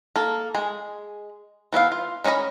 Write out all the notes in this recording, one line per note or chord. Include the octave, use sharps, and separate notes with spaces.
A#3 A4
G#3 G#4
E3 B3 E5 F5
F4
D#3 C#4 C#5 D#5 B5